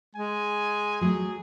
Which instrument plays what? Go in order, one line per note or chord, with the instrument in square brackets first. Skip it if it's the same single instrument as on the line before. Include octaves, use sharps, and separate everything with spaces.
[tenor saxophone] G#3 [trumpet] G#5
[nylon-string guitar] F#3 A3 [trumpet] G#4